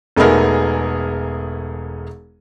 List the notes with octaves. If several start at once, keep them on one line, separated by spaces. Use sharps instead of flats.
E1 A3 B3 D#4 G#4 A#4